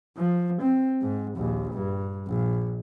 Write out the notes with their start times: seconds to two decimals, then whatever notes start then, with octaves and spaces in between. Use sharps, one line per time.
0.17 F3
0.61 C4
1.01 G#2
1.36 A#1 D#2
1.73 G2
2.26 A#1